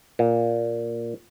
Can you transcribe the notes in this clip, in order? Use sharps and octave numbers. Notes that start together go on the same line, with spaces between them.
A#2